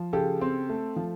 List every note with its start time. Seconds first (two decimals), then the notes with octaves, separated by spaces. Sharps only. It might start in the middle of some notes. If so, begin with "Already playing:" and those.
Already playing: F3
0.13 C#3 G4 A4
0.41 C4
0.69 A3
0.96 F3